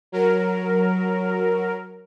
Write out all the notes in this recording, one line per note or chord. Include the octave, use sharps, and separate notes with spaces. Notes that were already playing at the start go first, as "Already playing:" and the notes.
F#3 A#4